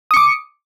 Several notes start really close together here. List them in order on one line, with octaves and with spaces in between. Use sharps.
D#6 C#7 D6